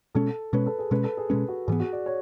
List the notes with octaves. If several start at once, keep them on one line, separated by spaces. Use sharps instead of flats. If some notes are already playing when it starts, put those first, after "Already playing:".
B2 G#3 C#4 A4
B2 G#3 C#4 B4
A4
G#4
B2 G#3 C#4 B4
A4
G#4
B2 G#3 C#4 B4
F#4
G#2 E3 B3 G#4
F#4
D5
C#5